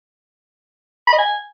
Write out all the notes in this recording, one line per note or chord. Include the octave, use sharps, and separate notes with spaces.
B5
D#5
G#5